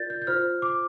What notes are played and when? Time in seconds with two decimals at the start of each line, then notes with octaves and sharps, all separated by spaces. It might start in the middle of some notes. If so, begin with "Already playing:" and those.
Already playing: F4 A#4 D5 G6 A6
0.10 G6
0.22 G6
0.27 F4 C5 F6
0.62 D6